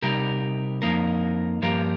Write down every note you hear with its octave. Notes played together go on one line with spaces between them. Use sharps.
C3 G3 D#4 G4 A#4
F2 F3 A#3 D#4 A#4
G2 F3 A#3 G4 A#4